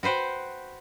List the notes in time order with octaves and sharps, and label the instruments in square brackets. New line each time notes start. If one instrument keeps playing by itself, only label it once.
[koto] F#4 B4 C5 F#5 G5